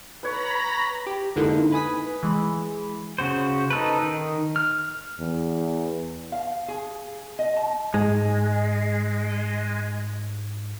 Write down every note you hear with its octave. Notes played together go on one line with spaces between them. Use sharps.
B4 C#5 A#5 B5 A#6
G4
F2 G#2 D3 A#3 D#4 E4
B4 G#5 D#6 B6
E3 G#3 B5
C#3 F#4 C5
D#4 A4 B4
D#3
F6
E2
F5
G#4
D#5
A5
G#2 G#3